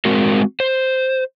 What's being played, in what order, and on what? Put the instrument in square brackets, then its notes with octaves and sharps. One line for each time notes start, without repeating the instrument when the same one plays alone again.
[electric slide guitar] G#3 C4 F#4 A#4
C5